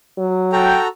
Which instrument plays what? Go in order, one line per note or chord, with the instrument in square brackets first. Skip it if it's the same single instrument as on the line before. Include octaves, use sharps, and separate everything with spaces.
[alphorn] F#3
[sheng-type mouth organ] F#4 A4 A#5 [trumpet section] G5